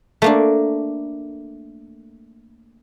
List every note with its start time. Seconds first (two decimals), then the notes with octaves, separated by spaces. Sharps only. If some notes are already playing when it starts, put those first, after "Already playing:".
0.22 A3 A#3 D4